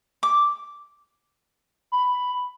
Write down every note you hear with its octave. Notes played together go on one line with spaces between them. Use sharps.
D6
B5